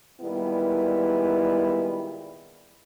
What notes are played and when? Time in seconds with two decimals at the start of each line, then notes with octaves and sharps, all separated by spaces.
0.21 A#2 D#3 G3 G#3 B3 E4